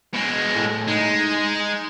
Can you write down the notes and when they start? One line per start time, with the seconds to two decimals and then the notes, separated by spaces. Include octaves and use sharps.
0.14 B2 G#3
0.55 A2
0.88 G#3 D#4